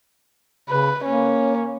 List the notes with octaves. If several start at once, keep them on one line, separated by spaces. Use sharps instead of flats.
C#3 B4
A#3 C#4